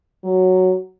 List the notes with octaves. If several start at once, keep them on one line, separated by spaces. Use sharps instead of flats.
F#3